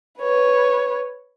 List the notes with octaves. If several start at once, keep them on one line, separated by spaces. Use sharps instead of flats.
B4 C#5